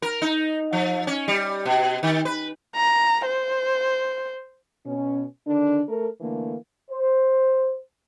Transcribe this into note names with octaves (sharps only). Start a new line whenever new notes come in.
A#4
D#4
F3
C#4
G3
B2
D#3
B4
A#5
C5
B2 C#4
D3 D#3 D4
A3 A4 A#4
D3 E3 A3 A#3
C5